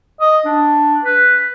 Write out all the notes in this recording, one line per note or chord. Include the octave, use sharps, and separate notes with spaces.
D#5
D4
B4